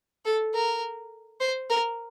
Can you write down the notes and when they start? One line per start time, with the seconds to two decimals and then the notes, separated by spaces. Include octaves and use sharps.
0.25 A4
0.54 A#4
1.40 C5
1.69 A#4